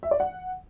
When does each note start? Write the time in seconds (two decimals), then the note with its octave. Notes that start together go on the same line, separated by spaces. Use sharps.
0.03 E5
0.11 D5
0.20 F#5